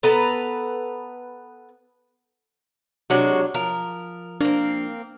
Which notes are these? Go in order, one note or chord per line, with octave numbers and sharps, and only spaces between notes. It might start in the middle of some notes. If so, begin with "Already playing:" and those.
B3 A4 B4 A#5
C3 F#3 G#3 D4 F#4 C#5
F3 A#4
A#3 C4 D4